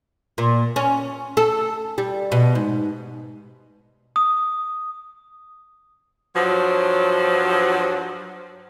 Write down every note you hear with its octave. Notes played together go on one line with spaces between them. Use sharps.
A#2
C#4
A4
G3
B2
G#2
D#6
G2 F3 F#3